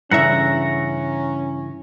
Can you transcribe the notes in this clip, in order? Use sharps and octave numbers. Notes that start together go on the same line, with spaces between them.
G2 C#3 E3 C#4 E5 F#5 A#5